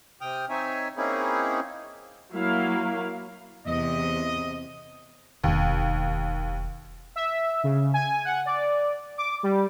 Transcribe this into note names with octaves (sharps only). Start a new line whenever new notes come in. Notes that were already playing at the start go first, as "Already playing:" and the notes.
C3 G5 D#6 F6
C4 D#4 C#5 E5 G#5
A#3 C4 C#4 D#4 E4 G#4
F#3 A#3 E4 F5
E2 C3 D#5
E1 D#2
E5
C#3
G#5
F#5
D5
D6
G3